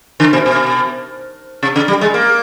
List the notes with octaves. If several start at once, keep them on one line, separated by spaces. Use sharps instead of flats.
D3
B2
B2
C3
C#3
G3
G#3
A#3